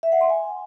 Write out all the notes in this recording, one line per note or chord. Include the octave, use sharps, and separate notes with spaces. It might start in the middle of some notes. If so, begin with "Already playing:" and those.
E5
F#5
C6
G#5